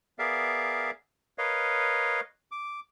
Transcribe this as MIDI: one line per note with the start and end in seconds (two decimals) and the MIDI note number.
0.19 0.91 59
0.19 0.91 68
0.19 0.91 70
0.19 0.91 74
0.19 0.91 76
0.19 0.91 77
1.38 2.21 70
1.38 2.21 71
1.38 2.21 73
1.38 2.21 75
1.38 2.21 77
2.51 2.80 86